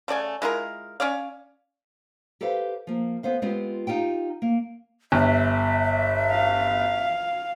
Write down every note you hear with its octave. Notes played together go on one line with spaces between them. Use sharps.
C#3 A3 D5 G#5
G#3 E4 F4 A#4
C#4 C#5 D5 F5
G4 A4 B4 C5 F5
F3 A#3
B3 A4 C5 F5
G#3 B3 C4 F4 G4
D#4 F4 G4 G5
A#3
G1 E5
F5